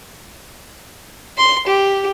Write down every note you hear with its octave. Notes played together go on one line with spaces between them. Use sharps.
C6
G4